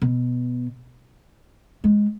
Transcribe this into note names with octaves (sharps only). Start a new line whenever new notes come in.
B2
G#3